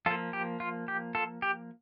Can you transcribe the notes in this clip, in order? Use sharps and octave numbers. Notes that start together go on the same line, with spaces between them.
F3 A#3 F4 A4
G4
F4
G4
F4 A4
G4